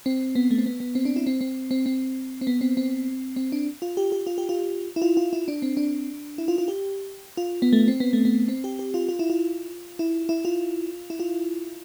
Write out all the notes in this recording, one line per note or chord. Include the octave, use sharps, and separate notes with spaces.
C4
B3
A3
C4
B3
B3
C4
D4
E4
C4
C4
C4
C4
C4
B3
C4
C4
C4
D4
F4
G4
G4
F4
G4
F4
E4
F4
F4
E4
D4
C4
D4
E4
F4
F4
G4
F4
B3
A3
C4
B3
A3
B3
C4
G4
G4
F4
F4
E4
F4
E4
E4
F4
E4
F4